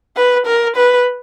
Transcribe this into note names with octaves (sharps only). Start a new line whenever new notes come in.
B4
A#4
B4